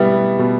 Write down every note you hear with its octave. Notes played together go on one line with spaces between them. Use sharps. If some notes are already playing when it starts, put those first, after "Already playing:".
Already playing: B2 G3 B3 E4
B2